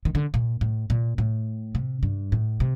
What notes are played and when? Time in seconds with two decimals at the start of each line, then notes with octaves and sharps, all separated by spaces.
0.05 D#3
0.15 D3
0.34 A#2
0.61 A2
0.90 A#2
1.18 A2
1.75 C3
2.03 G2
2.32 A2
2.60 C3